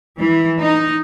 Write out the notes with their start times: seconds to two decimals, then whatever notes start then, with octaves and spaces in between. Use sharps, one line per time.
0.21 E3
0.60 D#4